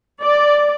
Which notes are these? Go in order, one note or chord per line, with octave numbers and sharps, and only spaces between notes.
D5